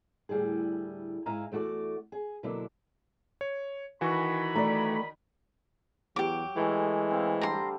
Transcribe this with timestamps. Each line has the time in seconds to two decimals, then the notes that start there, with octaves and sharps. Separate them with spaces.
0.29 D2 A2 G3 E4 G#4
1.26 G#2 E4 F5 G#5 A#5
1.52 E2 A3 F#4 G#4 D5
2.12 G#4
2.43 B2 D3 F#3 A#3 D4 E4
3.41 C#5
4.01 D#3 E3 F#4 G#5 B5 C#6
4.55 A3 D5 A#5
6.16 E2 F#3 G4 D6
6.57 E3 G#3 A3 A4
7.11 C4 F5
7.41 D3 G3 A5 A#5 C6